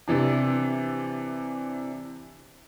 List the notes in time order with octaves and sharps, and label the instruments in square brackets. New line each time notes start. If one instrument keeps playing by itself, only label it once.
[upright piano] C3 E3 D4